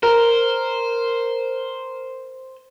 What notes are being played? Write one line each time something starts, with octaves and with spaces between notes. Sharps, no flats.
A#4 C5